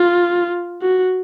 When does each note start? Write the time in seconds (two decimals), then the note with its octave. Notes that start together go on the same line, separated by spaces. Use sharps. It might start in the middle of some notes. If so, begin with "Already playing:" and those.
Already playing: F4
0.82 F#4